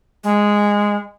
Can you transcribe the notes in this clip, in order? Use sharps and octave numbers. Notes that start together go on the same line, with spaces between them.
G#3